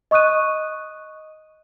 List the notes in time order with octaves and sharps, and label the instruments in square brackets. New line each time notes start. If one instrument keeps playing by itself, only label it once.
[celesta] D#5 C#6 D#6 F#6 D#7